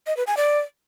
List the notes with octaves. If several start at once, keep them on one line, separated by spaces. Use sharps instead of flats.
D#5
B4
G#5
D5